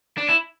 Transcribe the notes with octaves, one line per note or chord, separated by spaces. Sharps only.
D4
E4